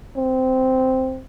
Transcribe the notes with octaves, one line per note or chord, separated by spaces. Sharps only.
C4